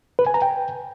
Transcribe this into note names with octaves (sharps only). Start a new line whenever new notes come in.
B4
G#5
A#5
G5